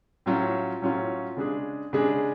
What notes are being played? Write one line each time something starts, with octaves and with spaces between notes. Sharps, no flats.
A2 F#3 C#4 F4
A2 F#3 C#4 F4
C#3 G#3 D4 G#4
C#3 G#3 D4 G#4